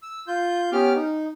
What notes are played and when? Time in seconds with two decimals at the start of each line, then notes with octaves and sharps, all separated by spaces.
0.02 E6
0.28 F4 G6
0.72 B3 C#4 G4 D6 F6
0.95 D#4